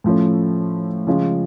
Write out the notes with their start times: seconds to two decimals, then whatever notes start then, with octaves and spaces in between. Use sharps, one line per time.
0.04 A2 F3 A3 C#4
1.07 C#3 F3 G#3 C#4 F4